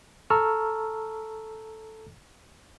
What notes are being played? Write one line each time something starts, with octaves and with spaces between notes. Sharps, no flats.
A4 A5 A#5 C#6 E6 F6